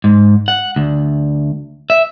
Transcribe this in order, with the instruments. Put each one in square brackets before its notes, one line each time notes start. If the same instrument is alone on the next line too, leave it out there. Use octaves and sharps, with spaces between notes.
[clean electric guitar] G#2
F#5
D2
E5